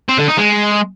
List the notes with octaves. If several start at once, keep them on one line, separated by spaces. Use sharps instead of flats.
C4
D3
D#4
G#3